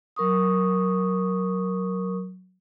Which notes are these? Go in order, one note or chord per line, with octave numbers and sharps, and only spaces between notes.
F#3 A#4 C#6 D#6